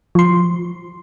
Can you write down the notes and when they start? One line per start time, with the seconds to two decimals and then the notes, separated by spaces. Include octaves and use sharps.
0.15 F3 C6